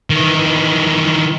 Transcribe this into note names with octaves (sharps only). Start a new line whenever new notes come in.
D#3 E3